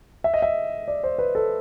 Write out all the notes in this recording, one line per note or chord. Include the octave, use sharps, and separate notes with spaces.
E5
D#5
E5
D5
C5
B4
A4